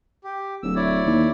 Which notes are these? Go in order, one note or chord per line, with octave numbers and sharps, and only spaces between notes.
G4
D1 E6
E4 C#5 D5
D#2